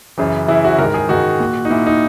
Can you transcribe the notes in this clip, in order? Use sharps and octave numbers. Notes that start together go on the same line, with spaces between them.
F#2 C#3 E3
F#2 C#3 E3 E4
F#4
G#2 D#3 A#4
G#4
G#2 D#3 F#4
A#2
D#4
A#2 E4
D#4